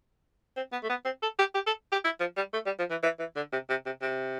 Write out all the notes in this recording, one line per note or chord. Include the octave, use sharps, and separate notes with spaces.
C4
B3
A3
B3
C4
A4
G4
G4
A4
G4
E4
F3
G3
A3
G3
F3
E3
E3
E3
D3
C3
C3
C3
C3